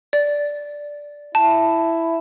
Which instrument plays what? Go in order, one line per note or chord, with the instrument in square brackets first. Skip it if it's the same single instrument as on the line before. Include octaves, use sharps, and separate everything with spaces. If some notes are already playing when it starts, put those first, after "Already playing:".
[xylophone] D5
[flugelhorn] E4 [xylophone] A5